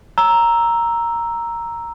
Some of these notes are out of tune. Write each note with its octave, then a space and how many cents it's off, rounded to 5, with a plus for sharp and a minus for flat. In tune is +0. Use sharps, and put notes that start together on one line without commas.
A#5 +0 E6 +0